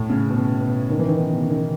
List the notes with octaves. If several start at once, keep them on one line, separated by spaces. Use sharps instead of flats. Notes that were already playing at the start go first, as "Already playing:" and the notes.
Already playing: A2
C#3
B2
B2
D#3
E3
D#3
C#3
B2
C#3
D#3